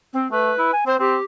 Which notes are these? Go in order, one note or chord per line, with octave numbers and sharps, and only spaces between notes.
C4
A3 B4
E4
G#5
C4 C5
C4 G4